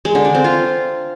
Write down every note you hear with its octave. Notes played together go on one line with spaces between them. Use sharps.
G#3
D3
D4
C4
F4